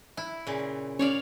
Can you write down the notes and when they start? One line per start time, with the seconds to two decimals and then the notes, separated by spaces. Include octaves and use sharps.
0.17 E4
0.47 A#2 C#3
0.99 C#4 C#5 D5 F5